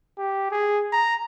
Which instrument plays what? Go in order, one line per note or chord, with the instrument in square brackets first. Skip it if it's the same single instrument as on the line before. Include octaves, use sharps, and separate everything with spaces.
[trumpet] G4
G#4
A#5